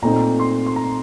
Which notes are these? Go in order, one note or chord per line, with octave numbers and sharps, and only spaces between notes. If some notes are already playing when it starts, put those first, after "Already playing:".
A#2 A3 C4 D#4 A#5
C6
C6
A#5